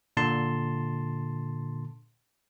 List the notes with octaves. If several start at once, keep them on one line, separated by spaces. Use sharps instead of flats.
A#2 D3 A5 C6